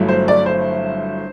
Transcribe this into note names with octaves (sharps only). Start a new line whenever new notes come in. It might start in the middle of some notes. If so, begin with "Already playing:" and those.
Already playing: G1 G2 F#3 A3 E4
C5
D5
C5